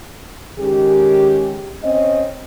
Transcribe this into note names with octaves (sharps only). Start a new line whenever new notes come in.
D#3 G#3 C#4 G4
C4 C#4 D#5